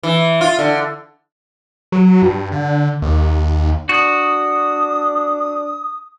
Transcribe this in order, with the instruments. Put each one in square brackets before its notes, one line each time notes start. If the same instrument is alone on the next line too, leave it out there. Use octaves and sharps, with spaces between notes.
[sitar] E3
F4
D3
[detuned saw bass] F#3
G2
D3
D#2
[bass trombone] D4 [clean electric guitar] F#4 [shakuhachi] D#6